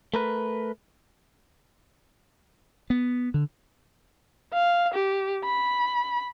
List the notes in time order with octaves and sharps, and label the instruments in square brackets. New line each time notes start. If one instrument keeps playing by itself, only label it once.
[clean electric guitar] A3 A#4 B4
[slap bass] B3
D3
[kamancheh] F5
G4
B5